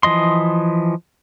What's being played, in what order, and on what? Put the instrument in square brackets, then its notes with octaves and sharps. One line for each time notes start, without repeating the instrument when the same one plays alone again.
[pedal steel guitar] E3 F3 D#5 C6